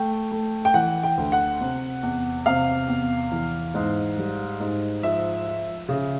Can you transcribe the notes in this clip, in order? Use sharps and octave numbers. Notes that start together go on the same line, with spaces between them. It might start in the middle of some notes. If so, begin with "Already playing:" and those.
Already playing: A3 G5
A3
G5
E3 F#5
G5
D2
F#5
C3
E2
C3 F5
E2
E3
G#2
G3
G#2
F3 E5
F3
C#3